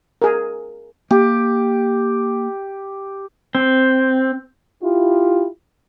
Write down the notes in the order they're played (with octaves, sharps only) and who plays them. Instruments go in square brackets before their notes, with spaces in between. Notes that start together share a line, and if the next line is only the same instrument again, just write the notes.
[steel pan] G#4 A#4
[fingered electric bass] A#3 [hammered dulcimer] G4
[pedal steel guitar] C4
[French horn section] E4 F4 G4